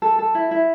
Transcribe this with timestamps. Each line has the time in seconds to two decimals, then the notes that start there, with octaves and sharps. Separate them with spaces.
0.02 A4
0.19 A4
0.35 E4
0.51 E4